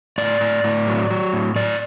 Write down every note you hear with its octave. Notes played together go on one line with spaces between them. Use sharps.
A2 D5
A2
A2
F#3
F#3
A2
A2 D5